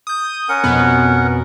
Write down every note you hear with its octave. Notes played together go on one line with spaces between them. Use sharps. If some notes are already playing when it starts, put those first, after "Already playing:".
D#6 G6
C#4 A#4 F#5 D#6
F2 B2 B3